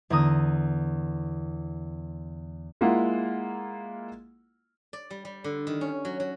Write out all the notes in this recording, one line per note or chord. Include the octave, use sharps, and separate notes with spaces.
E2 D3 A#5 D#6
G#3 A#3 E4 F4 F#5
D5
G3
G3
D3
D#3
C#4
F#3
F#3